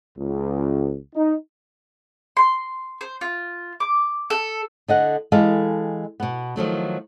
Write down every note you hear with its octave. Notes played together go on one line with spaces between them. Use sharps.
C#2
D#4
C6
C5
F4
D6
A4
D3 D#5 F#5
E3 G#3 G4 A4 D#5 F5
B2 B3
D#3 F3 F#3 A3